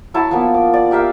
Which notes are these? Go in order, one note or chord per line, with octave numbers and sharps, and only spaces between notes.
F#3 E4 A5
F3 A#3 B3
D6
D5
G4 A#4 E5 F5